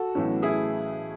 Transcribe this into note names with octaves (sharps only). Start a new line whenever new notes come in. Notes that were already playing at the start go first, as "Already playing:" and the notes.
Already playing: F#4 A4
B1 A2 E3 A3 C#4
E4 G#4